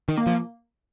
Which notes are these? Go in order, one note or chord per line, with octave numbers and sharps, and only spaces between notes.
D#3
A#3
F3